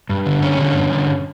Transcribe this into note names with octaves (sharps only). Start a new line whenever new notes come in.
G2
D3
G2 C#4
D3
G2
D3